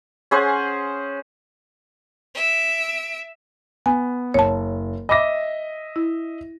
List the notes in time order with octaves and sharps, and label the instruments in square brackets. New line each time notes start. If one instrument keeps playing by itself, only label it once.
[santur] C#4 G#4 C5 F#5
[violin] E5 D7
[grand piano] B3 [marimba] G#5
[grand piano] F#1 [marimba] C#5 A5
[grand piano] D#5 E5 A#6 [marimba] B5 D6
[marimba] E4